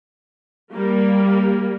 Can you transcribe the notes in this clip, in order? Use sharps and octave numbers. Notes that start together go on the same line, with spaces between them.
G3 A#3